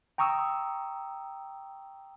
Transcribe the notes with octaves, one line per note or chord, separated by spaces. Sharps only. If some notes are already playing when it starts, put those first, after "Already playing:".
G5 A#5 C#6 D#6 E6